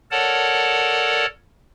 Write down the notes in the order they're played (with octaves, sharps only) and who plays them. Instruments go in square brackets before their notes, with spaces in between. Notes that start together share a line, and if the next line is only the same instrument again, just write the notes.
[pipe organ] A4 A#4 C#5 D5 F#5 A5